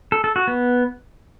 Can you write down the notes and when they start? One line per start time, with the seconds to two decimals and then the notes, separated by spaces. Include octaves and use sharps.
0.12 A4
0.24 A4
0.36 F#4
0.48 B3